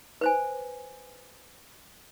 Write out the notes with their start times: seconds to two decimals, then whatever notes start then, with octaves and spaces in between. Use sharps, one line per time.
0.21 B4 C5 G#5